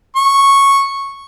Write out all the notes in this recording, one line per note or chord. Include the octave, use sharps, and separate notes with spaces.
C#6